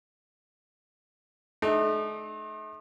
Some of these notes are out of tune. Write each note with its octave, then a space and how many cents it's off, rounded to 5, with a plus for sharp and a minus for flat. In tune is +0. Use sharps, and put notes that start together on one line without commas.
A3 -45 D#4 -35